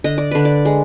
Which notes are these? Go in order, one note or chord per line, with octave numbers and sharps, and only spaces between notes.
D3 D#5
D5
D3 B4
D5
G#3